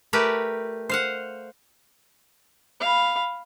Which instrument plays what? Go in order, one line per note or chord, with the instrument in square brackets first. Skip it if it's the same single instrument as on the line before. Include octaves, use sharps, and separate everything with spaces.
[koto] A3 G4 A#4 B4 D5 G5
C5 F5 F#5
[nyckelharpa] F5 B5